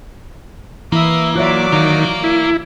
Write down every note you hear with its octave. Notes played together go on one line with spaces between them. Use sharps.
E3 A#3 E4 E5 D#6
F#3 F4 C#5 D5 E5 D6
D#3 A#4 F5
E4